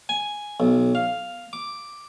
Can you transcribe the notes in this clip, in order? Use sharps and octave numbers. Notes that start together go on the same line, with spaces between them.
G#5
B1
F5
D6